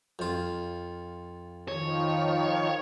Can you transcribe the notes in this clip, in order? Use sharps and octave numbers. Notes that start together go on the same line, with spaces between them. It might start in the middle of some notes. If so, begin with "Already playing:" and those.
F2 F4
D#3 F3 C#5